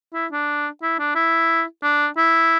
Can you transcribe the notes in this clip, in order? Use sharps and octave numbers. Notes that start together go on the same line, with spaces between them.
E4
D4
E4
D4
E4
D4
E4